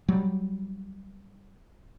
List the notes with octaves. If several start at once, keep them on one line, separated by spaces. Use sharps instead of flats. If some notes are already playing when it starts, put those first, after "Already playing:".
F#3 G3